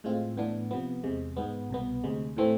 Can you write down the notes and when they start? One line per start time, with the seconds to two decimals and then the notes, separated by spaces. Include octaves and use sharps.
0.04 A2 G#3 C4 F4
0.37 A2 E3 B3 D4
0.71 C3 F3 B3
1.04 E2 C3 G#3
1.36 G#2 G#3 B3
1.70 C2 B2 B3
2.04 D2 C3 G#3
2.37 A2 E3 A3 C4